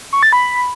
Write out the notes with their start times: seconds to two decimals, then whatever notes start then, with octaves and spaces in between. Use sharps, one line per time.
0.13 C#6
0.23 A6
0.33 B5